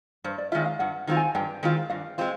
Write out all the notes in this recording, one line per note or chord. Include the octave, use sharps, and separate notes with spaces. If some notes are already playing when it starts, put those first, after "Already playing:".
G2 C5
D5
D#3 G#3 C4 F4 E5
F5
G2 F#5
D#3 G#3 C4 F4
G#5
G2 G5
D#3 G#3 C4 F4
G2 F5
G#3 C4 F4